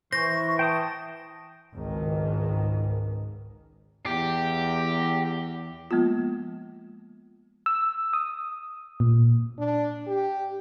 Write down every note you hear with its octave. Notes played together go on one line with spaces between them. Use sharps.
E3 C5 C#6 A#6
G5 A5 D#6
G#1 C#2 G#2 D#3
E2 G4
F3 G#3 A#3 B3 F4
E6
D#6
A#2
D4
G4